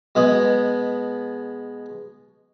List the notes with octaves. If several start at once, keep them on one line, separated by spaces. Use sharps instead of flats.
B2 G#3 B3